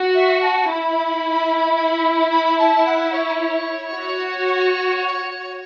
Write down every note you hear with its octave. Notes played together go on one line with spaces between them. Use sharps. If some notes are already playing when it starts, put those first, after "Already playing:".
Already playing: F#4
E5
A5
E4 B5
B5
A5
F#5
C#5
F#4